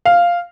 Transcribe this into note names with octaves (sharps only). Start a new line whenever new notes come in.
F5